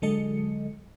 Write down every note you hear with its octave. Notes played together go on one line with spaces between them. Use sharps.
D3 F#3 G#3 A4 D#5 C#7